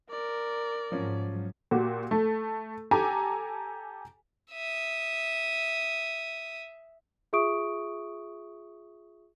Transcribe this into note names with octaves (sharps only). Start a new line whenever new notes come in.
A#4 D5
G#2 F3 F#3 C#4
A#2 F#4 G4
A3
G4 A4 G#5 A#5
E5 D#6
F4 G#4 E5 C#6 D#6 D7